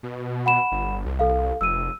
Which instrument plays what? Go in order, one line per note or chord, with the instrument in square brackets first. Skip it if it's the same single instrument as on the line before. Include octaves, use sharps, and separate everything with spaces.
[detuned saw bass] B2
[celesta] F#5 B5 E7
[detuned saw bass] G1
C2
[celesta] A4 F5
[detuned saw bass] F1 [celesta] E6 D#7